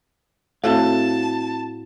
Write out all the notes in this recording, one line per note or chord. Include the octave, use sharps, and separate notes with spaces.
A2 C4 F#4 F5 A5